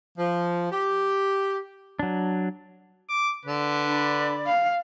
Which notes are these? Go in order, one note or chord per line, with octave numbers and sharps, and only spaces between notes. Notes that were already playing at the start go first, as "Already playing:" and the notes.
F3
G4
F#3 D4
D6
D3 B4
D4 D5 B5
F5